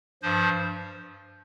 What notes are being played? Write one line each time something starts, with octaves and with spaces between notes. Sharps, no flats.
G2 F3 C5